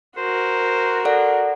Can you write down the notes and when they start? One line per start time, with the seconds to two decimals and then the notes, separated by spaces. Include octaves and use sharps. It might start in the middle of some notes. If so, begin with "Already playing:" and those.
0.18 F#4 A#4 C5
1.05 A4 D5 F#5